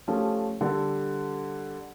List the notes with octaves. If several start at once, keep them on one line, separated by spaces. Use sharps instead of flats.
F3 A3 C#4 G4
D3 G3 A4